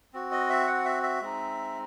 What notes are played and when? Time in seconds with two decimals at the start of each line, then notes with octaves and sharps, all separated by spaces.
0.14 C4 F#4
0.32 D#5
0.50 E5
0.67 F#5
0.85 E5
1.03 E5
1.21 G#3 C4 D#4